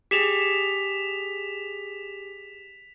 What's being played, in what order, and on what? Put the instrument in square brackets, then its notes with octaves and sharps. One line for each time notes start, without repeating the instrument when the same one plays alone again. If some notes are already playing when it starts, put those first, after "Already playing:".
[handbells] G4 G#4 [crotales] B6 E7 F7